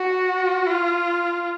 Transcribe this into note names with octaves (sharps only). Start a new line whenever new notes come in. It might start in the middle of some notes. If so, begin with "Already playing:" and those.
Already playing: F#4
F4